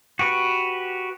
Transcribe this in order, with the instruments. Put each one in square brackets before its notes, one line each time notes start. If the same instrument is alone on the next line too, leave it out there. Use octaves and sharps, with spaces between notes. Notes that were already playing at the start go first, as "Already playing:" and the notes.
[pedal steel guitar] F#4 G4 B4